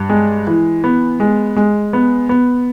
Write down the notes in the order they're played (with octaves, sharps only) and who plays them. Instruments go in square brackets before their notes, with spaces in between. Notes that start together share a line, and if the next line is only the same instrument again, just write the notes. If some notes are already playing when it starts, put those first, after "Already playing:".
Already playing: [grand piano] G2
G#3
E3
B3
G#3
G#3
B3
B3